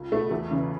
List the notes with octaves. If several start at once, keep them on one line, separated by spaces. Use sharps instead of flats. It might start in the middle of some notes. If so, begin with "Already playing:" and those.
Already playing: C#2
B2 A3
E2 A3
C#3 E3